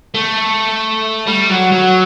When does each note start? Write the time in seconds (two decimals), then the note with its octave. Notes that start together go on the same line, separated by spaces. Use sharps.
0.14 A3
1.27 G3
1.49 F#3
1.72 F#3